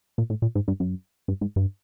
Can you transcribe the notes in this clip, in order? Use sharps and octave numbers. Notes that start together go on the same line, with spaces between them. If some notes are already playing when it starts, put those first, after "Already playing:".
A#2
A2
A#2
G#2
G2
F#2
G2
G#2
G2